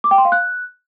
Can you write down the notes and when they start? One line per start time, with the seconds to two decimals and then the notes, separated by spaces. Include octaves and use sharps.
0.04 D6
0.11 G5
0.18 C6
0.25 F5
0.32 F#6